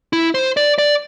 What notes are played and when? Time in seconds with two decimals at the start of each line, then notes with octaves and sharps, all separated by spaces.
0.13 E4
0.35 C5
0.57 D5
0.78 D5